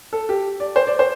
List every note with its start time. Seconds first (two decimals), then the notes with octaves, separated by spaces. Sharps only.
0.13 A4
0.29 G4
0.60 D5
0.76 C5
0.87 D5
0.99 C5